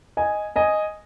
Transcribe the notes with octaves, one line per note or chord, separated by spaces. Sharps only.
D#5 G#5
D#5 G#5